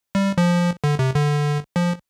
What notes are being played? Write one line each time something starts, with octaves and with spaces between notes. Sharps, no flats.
G3
F3
D3
C3
D3
F3